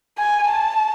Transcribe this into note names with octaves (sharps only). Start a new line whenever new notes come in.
G#5
A5